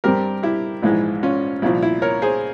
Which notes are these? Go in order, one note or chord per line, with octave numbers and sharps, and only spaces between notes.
G2 G3 C4 G4 A#4
E4 G4
A#1 G#2 E3 G#3 E4
C#4 F4
C2 A#2 F3 E4
E4
A#4 C#5
G#4 C5